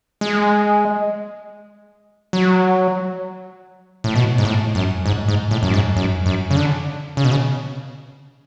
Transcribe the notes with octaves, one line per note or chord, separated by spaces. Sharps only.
G#3
F#3
A2
B2
G#2
A2
F#2
G#2
G#2
A2
F#2
G#2
F#2
F#2
C#3
D3
C#3
B2
C#3